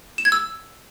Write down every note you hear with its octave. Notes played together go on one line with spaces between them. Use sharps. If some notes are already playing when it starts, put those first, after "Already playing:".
E7
G#6
E6